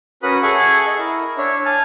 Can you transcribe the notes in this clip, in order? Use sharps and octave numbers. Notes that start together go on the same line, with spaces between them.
C#4 F#4 A#4 B4 B5 D#6
G#4 A4 E5 F#5 G#5 C#6
D#5
E4 A#4
D4 C#5 E5
G#5 A5 F6